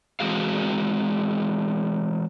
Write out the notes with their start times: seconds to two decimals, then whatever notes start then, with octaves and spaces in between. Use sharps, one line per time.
0.20 E3 G#3 C4 F#4 G#4 F5